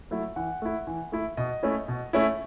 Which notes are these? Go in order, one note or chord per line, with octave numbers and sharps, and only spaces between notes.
F#3 A3 E4
E3 F#5
A3 E4
E3
A3 E4
B2 D#5
A3 C#4 E4
B2
A3 C#4 E4